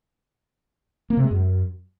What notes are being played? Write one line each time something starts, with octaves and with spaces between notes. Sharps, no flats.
A#3
C3
G#3
F#2